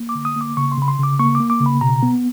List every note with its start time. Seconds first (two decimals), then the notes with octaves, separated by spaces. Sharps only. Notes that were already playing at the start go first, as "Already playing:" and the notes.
Already playing: A#3
0.09 D6
0.15 D3
0.25 D#6
0.36 A#3
0.41 D6
0.57 C#3 C#6
0.72 C6
0.77 C#3
0.82 B5
0.88 C6
0.99 C#3 D6
1.19 A#3 C#6
1.35 A#3 D6
1.50 D6
1.61 C#3
1.66 B5
1.81 B2 A#5
2.03 B3